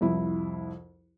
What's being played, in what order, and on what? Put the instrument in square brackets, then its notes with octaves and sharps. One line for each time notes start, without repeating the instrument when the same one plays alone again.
[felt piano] C2 F2 E4